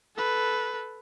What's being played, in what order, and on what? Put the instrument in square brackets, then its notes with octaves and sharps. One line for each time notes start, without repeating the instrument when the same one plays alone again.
[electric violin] A4 B4